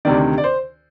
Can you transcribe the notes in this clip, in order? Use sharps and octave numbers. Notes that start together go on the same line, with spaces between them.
D2 C3 D#3 D5
D5
C5